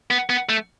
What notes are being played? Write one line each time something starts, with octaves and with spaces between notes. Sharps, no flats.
B3
B3
A3